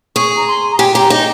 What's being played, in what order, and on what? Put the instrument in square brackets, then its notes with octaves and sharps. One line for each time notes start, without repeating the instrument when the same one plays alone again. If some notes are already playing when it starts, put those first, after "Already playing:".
[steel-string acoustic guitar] G#4 [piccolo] C#6
[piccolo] A#5
C6
A#5
[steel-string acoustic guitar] G4 [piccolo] G#5
[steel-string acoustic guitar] G4 [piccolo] A#5
[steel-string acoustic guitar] D#4